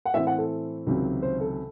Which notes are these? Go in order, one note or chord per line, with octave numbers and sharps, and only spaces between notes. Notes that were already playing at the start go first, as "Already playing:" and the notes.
F#5
A2 E3 C4 E5
F#5
A4
C#2 C3 D#3 F#3
C5
A4